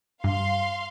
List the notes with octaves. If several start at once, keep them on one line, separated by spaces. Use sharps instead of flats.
G2 F5 C6